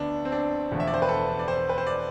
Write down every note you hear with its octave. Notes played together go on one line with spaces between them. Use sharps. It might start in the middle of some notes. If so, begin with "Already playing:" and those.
Already playing: D2 B3 D4
C4
D4
E1 E2 D3 F3 A3
E5
D5
C5
B4
A4
D5
C5
B4
C5
D5